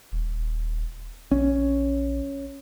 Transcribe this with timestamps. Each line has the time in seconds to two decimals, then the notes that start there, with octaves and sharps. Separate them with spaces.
0.12 D#1
1.32 A#1 C#4